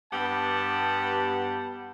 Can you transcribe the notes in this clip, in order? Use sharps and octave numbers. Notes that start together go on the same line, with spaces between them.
G2 B3 G4 F#5 A5